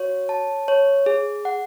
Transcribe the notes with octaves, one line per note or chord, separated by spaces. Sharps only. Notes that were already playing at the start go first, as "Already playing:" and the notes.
Already playing: F#4 C#5
A5
C#5
G#4
F#5